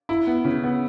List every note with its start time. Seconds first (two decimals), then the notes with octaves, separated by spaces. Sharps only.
0.09 E4
0.27 B3
0.45 C#3
0.64 B3